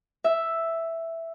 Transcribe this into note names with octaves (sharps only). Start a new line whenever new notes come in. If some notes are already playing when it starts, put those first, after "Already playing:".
E5